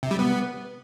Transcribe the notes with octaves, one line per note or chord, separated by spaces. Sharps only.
C3
G3
B3